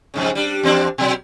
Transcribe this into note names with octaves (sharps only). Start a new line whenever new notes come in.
F2 G#2 C#3
G3 D4
E2 C4 D4
B2 F#3